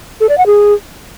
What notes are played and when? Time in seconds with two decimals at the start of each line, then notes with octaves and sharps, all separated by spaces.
0.20 A4
0.29 D5
0.38 F#5
0.46 G#4